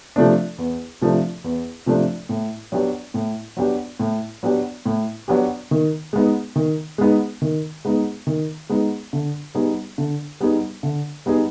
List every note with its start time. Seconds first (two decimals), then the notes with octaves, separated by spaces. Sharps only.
0.16 C3 F3 A3 D4
0.58 E2
1.02 C3 F3 A3 D4
1.44 E2
1.86 C3 F3 A3 D4
2.29 A2
2.72 F#3 B3 D4 G4
3.14 A2
3.57 F#3 B3 D4 G4
3.99 A2
4.43 F#3 B3 D4 G4
4.86 A2
5.28 F#3 B3 D4 G4
5.71 D#3
6.13 G#3 B3 D#4
6.56 D#3
6.98 G#3 B3 D#4
7.42 D#3
7.85 G#3 B3 D#4
8.27 D#3
8.69 G#3 B3 D#4
9.13 D3
9.55 G3 B3 D#4 G#4
9.98 D3
10.40 G3 B3 D#4 G#4
10.83 D3
11.26 G3 B3 D#4 G#4